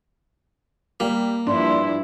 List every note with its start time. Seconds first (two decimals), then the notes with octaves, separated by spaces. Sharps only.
1.00 G3 A#3
1.47 G2 F3 D4 E4 C6